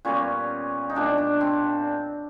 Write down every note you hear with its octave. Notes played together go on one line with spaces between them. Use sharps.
A#2 G3 B3 C#4
D#4
A#2 G3 B3 D4
D4
C4